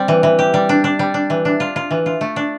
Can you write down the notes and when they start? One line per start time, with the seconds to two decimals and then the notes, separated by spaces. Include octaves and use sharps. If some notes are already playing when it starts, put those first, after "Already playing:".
Already playing: G3 C4
0.08 E3
0.23 E3
0.39 G4
0.54 G3
0.69 D4
0.84 D4
0.99 G3
1.14 D4
1.30 E3
1.45 D4
1.60 F4
1.76 F4
1.91 E3
2.06 F4
2.21 A3
2.36 D4